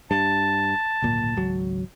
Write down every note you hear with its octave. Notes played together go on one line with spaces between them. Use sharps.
G2 A5
D1 G#1 A#2
G#1 C#2 F#3